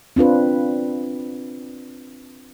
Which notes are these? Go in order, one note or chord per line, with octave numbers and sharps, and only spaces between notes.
C4 D4 F4 B4